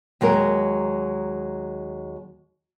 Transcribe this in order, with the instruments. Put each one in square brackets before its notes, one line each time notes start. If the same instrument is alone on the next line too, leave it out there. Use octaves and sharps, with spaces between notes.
[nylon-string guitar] D#2 F#3 G#3 A#4